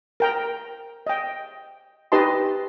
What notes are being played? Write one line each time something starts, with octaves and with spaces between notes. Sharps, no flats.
A#4 G5 A#5
D#5 G5
D#4 G4 B4 D#5 A5 C6